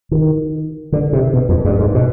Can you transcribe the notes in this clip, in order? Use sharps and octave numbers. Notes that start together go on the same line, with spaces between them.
D#3
D3
C3
B2
F2
G2
G#2
B2